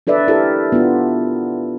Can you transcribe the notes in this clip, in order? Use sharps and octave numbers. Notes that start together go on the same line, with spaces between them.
D4 A4 B4 D5 E5
E4 G4 A4 A#4
B3 D4 F4